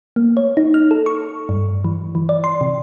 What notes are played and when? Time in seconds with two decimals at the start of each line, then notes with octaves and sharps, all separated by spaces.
0.16 A#3
0.37 C#5
0.57 D#4
0.74 F6
0.91 A4
1.06 C#6
1.49 G2
1.84 E3
2.15 E3
2.29 D5
2.44 C6
2.61 C3